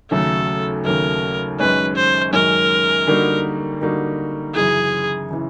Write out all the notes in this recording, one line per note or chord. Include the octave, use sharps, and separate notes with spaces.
D#2 C#3 F#3 A3 A4
D#2 C#3 F#3 A3 A#4
F#2 D#3 G#3 C#4 B4
C5
F#2 D#3 G#3 C#4 A#4
D3 G3 A#3 D#4 F#4
D3 G3 A#3 D#4 F#4
F#2 C#3 E3 G#4
C#3 E3